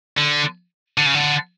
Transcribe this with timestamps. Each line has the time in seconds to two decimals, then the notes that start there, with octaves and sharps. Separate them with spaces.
0.18 D3
0.98 D3
1.06 C#3
1.14 D3